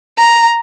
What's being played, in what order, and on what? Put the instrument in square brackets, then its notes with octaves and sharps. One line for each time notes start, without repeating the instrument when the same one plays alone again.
[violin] A#5